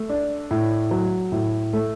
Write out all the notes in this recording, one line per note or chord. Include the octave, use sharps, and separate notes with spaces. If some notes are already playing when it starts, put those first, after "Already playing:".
Already playing: A3
D4
A2
F#3
A2
A3